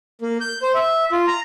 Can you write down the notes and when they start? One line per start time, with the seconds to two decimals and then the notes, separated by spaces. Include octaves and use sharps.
0.22 A#3
0.41 G6
0.62 C5
0.75 E5
1.12 F4
1.28 A#5